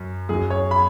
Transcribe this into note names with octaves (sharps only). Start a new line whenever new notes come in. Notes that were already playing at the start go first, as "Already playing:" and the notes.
Already playing: F#2
F#2 F#3 G#4
C#5
B5